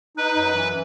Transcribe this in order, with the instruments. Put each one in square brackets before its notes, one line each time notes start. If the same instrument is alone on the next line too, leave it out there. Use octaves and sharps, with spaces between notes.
[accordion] D#4 [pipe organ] B4
[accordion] F#2
E3